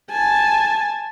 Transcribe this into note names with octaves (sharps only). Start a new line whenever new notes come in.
G#5 A5